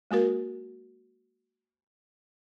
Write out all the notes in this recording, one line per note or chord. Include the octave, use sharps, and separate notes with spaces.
G#3 A#3 F#4 A#4